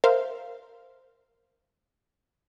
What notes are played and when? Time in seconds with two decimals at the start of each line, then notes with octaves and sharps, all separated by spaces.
0.04 A#4 C5 E5 F5